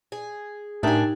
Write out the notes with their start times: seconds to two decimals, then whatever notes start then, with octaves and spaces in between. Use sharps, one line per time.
0.12 G#4
0.83 A2 D4 D#4 G4 A#4 E5 G5 G#5